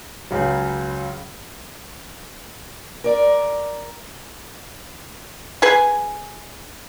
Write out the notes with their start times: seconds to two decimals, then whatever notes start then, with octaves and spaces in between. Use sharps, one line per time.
0.31 C#2 C#3 F#3
3.04 A#4 D5
5.62 G#4 B4 G#5